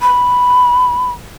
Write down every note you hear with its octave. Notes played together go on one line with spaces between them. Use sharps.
B5